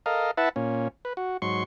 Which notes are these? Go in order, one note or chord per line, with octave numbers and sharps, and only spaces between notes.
A4 A#4 D#5 F5
E4 B4 E5 F#5 A5
A#2 C#4
B4
F#4
G#2 F#3 C6 C#6